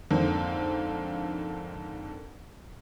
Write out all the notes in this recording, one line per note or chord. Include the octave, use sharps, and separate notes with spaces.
F2 G#2 D3 A#3 C4